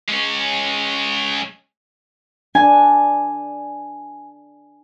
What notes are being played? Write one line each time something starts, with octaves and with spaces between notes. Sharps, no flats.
G#3 C#4
D4 G#5